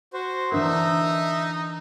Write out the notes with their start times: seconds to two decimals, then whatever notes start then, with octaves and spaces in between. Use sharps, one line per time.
0.13 F#4 C5
0.52 E3 D4 D#4 A#4 E5